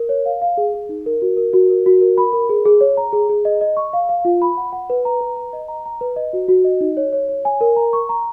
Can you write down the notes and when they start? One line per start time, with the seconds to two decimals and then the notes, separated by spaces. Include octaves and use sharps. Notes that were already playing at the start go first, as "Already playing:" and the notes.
Already playing: A#4
0.09 C#5
0.26 F5
0.42 F5
0.57 G#4
0.74 G#4
0.89 D#4
1.06 A#4
1.22 F#4
1.37 A#4
1.53 F#4
1.70 A#4
1.86 F#4
2.01 A#4
2.18 B5
2.33 A#4
2.49 G#4
2.65 G#4
2.81 C#5
2.97 A#5
3.13 G#4
3.29 G#4
3.45 D#5
3.61 D#5
3.77 C#6
3.93 F5
4.09 F5
4.25 F4
4.42 B5
4.57 F#5
4.72 F#5
4.90 B4
5.05 A#5
5.21 B4
5.36 A#5
5.53 D#5
5.68 A#5
5.86 A#5
6.01 B4
6.16 D#5
6.33 F#4
6.48 F#4
6.64 D#5
6.81 D#4
6.97 C#5
7.13 C#5
7.29 C#5
7.45 G#5
7.61 A#4
7.76 A#5
7.93 C#6
8.09 A#5